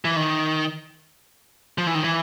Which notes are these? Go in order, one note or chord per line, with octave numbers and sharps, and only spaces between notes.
E3
D#3
F3
E3
D#3
E3